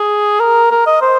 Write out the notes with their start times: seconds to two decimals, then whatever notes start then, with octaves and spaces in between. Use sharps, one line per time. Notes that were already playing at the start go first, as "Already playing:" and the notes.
Already playing: G#4
0.40 A#4
0.71 A#4
0.87 D#5
1.02 C5